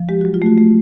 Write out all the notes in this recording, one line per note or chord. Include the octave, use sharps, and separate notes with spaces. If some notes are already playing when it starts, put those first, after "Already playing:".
Already playing: F3
G#3 G4
F#3 F#4
F4
A3 F#4
A3